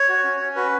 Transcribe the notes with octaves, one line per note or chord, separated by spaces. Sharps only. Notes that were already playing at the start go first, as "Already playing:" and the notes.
Already playing: C#5
F#4
C#4
C#4
F#4 B4